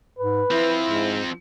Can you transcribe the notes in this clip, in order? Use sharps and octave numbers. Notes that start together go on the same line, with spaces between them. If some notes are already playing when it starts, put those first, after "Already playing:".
G#2 B4
F3 C4 E4
G#2